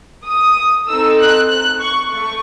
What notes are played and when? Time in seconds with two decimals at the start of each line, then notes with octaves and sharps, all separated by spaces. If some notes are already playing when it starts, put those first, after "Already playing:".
0.26 D#6
0.88 C4 D#4 A4 E6
1.19 F#6
1.49 F#6
1.81 C#6
2.12 A3 C#6